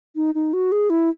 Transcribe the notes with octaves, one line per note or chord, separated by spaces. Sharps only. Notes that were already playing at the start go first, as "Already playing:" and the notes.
D#4
D#4
F#4
G#4
E4